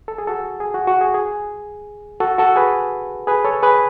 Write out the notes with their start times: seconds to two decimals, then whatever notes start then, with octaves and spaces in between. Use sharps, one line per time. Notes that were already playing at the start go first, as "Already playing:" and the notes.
0.08 A4
0.18 G#4
0.27 F#4 A4
0.60 G#4
0.74 F#4
0.87 F#4
1.01 G#4
1.14 G#4
2.20 F#4 A4
2.38 F#4 A4
2.56 G#4 B4
3.27 G#4 B4
3.45 A4 C#5
3.63 G#4 B4